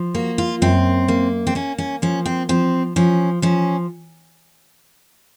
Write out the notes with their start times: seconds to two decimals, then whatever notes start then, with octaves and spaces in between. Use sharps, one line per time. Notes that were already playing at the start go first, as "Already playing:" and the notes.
Already playing: F3
0.15 A#3 F#4
0.38 F4
0.62 F#2 C4
1.08 A#3
1.47 C4
1.55 A#3 C#4
1.78 C#4
2.02 F3 C#4
2.26 C4
2.49 F3 C4
2.96 F3 C#4
3.42 F3 C#4